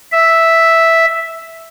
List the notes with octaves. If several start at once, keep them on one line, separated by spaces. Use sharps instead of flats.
E5